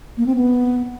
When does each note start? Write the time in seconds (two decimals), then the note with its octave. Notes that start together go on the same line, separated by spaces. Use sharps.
0.17 A#3
0.26 C4
0.35 B3